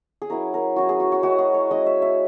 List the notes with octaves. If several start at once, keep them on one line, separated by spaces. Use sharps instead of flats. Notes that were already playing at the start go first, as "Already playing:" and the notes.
G#4
F#3 C#4 E4 A#4
A#4
F#3 C#4 E4 F#4
G#4
F#4
F#4
G#3 C#4 E4 F#4
G#4
C#5
G#3 C#4 E4 D#5
E5
E5